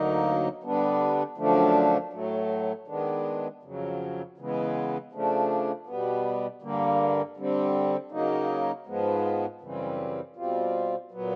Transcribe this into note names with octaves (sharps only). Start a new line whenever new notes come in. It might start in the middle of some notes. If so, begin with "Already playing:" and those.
Already playing: D2 D3 F#3 A#3 D#4
D3 G3 B3 D4
F#2 D3 F3 A3 D4
A2 F#3 A3
D#3 G#3 B3 D4
F2 C#3 F#3
C#3 E3 G#3 B3
C#3 F3 A3 D4
B2 G3 B3
G2 D3 G3 A#3
D3 G3 C4
C#3 F#3 A#3 D#4
G#2 F3 G#3 B3
F#2 C#3 E3 G3 C4
B2 G3 C4 F4
A#2 F#3 B3